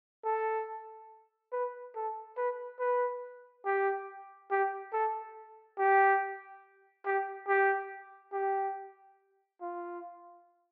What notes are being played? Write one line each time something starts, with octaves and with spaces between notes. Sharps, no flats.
A4
B4
A4
B4
B4
G4
G4
A4
G4
G4
G4
G4
F4